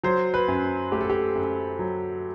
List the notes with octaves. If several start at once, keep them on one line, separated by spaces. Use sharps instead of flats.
F#3 C5
B4
F#2
A3 G4
A4
G4
F#2
F#3